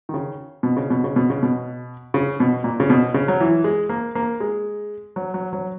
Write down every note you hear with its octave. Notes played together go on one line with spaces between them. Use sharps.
D#3
C#3
B2
C#3
B2
C#3
B2
C#3
B2
C#3
B2
A#2
C#3
B2
C#3
F#3
E3
G#3
A#3
A#3
G#3
F#3
F#3
F#3